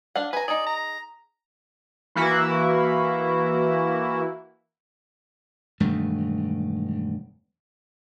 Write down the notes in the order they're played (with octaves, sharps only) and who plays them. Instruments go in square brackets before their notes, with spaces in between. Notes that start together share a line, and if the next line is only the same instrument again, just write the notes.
[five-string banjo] D4 F5 F#5
[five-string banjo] B4 A#5 [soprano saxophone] G#5
[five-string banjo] D#4 G#4 [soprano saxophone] D5
[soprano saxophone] A#5
[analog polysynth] E3 A#3 E4 F#4
[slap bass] E1 G2 D#3 A3